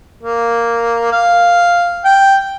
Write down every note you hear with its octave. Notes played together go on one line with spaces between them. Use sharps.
A#3
F5
G5